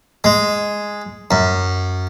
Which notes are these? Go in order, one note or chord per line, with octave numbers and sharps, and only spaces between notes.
G#3
F#2